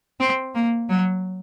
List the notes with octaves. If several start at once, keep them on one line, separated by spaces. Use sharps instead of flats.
C4
A#3
F#3